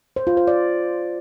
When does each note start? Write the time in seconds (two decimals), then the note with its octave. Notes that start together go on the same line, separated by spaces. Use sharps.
0.16 C5
0.27 F4
0.37 C5
0.48 D5